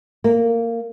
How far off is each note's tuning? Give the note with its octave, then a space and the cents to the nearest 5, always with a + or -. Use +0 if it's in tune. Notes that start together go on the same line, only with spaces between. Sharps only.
A#3 -15